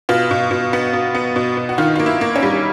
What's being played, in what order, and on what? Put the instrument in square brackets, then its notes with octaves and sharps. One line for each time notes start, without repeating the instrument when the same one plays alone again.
[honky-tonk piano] B2 F4
B2
B2
B3
B2
B3
B2
B2
F#4
D#3 F4
A#3 F4
E4
A#3
C#4
G3